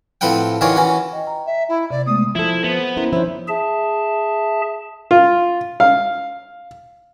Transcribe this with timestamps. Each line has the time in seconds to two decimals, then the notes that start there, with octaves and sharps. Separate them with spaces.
0.21 A2 F3 C4 B4 F#5 G5
0.61 D#3 E3 F4 F#4 C#5 D5
0.76 E3 C#4 F#4
1.13 D#5 G5
1.27 A#5
1.46 E5
1.69 E4
1.90 C3 D5
2.06 G#3 A3 B3 D#6
2.35 F3 E4 A4
2.64 B3 C5
2.97 C#4 E4 A#4 C5
3.13 F3 D4 E4 C5 C#5
3.48 G#4 E5 A5
5.11 F4
5.80 F5